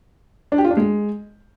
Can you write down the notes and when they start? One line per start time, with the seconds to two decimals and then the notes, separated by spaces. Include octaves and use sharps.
0.52 D4
0.58 G4
0.64 F4
0.71 D4
0.77 G#3